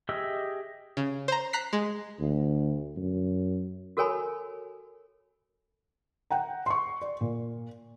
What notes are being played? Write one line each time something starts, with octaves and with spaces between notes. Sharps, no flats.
G4 G#4 D#5 E5 E6
C#3
C5 A#5
A#5 F#6 B6 C7
G#3
D2
F#2
F#4 A4 A#4 C#5 G#5 B5
F#5 G5 A#5
C6 C#6
D5
A#2